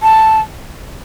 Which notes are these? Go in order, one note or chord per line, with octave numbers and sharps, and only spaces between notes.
A5